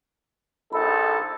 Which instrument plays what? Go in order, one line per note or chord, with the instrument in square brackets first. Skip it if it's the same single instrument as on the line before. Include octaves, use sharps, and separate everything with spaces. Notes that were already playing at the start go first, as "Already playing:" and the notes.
[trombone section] A#1 D#4 A4 [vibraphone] B5